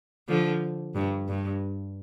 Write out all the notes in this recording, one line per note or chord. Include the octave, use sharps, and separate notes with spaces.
D3 F3
G2
G2